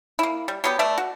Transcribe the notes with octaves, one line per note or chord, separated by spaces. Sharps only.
A#3 E4
G3
F#3 B3 G4
A3 B4 D5 E5
F#4